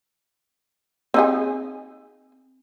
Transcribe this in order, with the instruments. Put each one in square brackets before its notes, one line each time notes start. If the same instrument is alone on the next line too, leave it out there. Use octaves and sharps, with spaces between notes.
[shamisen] C4 D#4 G#4